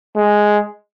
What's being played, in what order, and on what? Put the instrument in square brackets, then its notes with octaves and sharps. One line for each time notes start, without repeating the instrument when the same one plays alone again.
[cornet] G#3